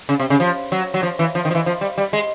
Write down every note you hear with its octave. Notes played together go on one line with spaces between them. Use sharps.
C#3
C3
C#3
F3
F#3
F#3
F3
E3
F3
D#3
F3
E3
F3
G3
G3
G#3